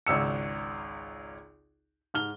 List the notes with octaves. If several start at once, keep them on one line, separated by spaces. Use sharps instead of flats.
G#1 C#2 E6 C#7
G#2 F6 G7